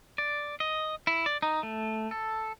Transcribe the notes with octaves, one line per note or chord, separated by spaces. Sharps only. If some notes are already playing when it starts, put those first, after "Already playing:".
D5
D#5
E4
D5
D#4
A3
A4